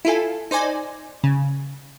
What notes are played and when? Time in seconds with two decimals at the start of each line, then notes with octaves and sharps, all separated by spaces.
0.05 E4 F4 A4 G#5
0.51 D#4 C5 D5 G#5
1.24 C#3